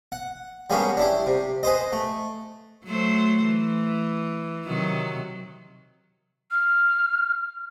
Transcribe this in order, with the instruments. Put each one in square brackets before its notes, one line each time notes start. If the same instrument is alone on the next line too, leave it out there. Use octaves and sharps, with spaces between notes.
[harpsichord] F#5
G3 G#3 A#3 B3 C#4 D4
D4 E4 G4
C3
G#4 B4 C5 D#5
A3
[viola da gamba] F#3 A3 C5
E3
C3 D#3 F#3
[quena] F6